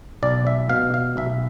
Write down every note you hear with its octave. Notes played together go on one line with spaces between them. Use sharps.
B1 D5
E5
B2 F5
F5
B1 E5